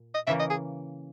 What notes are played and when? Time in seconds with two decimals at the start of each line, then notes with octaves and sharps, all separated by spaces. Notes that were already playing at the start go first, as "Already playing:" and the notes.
Already playing: A#2
0.15 D#5
0.27 C#3 E3 A#3 E5
0.39 D#5
0.50 G#4